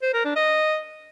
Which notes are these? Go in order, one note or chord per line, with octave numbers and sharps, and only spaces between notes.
C5
A#4
D4
D#5